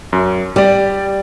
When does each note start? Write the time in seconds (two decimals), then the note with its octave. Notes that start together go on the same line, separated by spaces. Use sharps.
0.13 F#2
0.56 G3 G4 D5